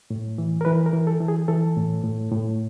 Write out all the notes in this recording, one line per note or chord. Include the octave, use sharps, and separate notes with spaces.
A2
E3
A#4
E3 B4
A#4
E3
A4
E3
G#4
E3 A4
A2
A2
A2